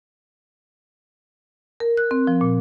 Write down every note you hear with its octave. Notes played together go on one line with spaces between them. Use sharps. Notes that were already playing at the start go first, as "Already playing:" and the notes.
A#4
F#6
C4
F3
A#2